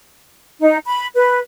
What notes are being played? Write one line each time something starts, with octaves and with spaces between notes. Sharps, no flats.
D#4
B5
B4